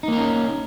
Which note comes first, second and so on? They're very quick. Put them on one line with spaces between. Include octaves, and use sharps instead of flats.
D#4 A#3 A#4 C#4